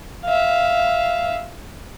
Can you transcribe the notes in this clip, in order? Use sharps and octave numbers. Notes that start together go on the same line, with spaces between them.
E5 F5